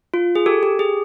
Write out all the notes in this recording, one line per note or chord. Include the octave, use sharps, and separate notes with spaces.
F4
G#4
G4 A4
G4
G#4